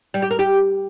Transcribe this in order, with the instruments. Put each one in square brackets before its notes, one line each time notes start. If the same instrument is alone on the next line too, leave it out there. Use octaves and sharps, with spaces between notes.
[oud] G3
G4
A#4
G4